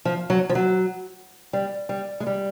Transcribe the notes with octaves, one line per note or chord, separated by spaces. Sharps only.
F3
F#3
F3
F#3
G3
G3
G#3
G3